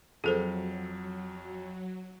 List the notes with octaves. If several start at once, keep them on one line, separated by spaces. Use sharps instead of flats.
F2 F#3 G#4 A4 C5